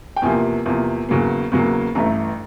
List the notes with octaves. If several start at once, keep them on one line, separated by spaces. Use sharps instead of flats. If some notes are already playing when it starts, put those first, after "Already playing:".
G5
E2 C3 F3 A#3 G#5
E2 C3 F3 A#3
E2 C#3 F#3 A#3
E2 C#3 F#3 A#3
A1 G2 E3 A3 A#5